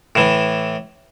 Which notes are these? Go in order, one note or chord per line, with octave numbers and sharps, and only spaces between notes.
A2 E3